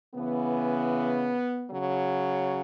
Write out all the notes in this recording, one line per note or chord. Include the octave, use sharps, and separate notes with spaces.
C#3 E3 B3
C#3 F#3